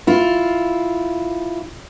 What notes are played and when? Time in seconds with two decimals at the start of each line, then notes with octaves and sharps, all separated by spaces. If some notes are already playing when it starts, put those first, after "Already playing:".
0.07 E4 F4